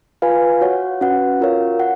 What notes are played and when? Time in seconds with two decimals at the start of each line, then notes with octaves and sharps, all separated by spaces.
0.22 F4 B4 F5 G#5
0.61 F#4 C#5 F#5
1.01 C#4 F#4 B4 F#5
1.40 F4 A#4 C#5 F5
1.80 F#5